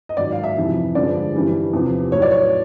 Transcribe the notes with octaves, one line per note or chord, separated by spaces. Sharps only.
D#5
G#2 D#3 F#3 D5
F5
E5
F2 C3 E3 G3
G2 D3 F3 G#3 D5
G2 E3 G3
E2 C3 F3
A2 F#3 C#5
D5
C#5